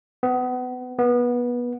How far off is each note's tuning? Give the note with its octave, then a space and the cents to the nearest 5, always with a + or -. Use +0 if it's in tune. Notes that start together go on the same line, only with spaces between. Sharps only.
B3 +30
B3 -20